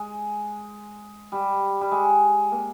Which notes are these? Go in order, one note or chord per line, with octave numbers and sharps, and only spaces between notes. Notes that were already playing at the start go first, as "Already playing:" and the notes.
Already playing: G#3
G3
G3
G#3
A#3